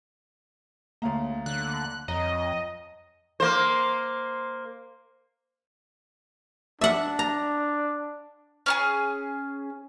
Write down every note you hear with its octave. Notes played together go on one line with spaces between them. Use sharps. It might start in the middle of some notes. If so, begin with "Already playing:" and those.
D2 A#3 C#5 F5 A#5
D3 F#6
F2 C#5 D#5 A#5
A#3 C5
D4 E5 F#5
A#5
C#4 D#4 G#4